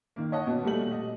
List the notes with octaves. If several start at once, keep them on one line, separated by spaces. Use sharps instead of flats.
D#3 A#3
C#5 D#5 F#5 A5
B2
A#2 G3 A3 F#7
D#5